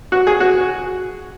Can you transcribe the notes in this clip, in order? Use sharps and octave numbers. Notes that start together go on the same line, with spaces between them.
F#4
G#4
F#4